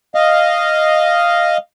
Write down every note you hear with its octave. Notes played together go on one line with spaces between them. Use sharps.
D#5 F5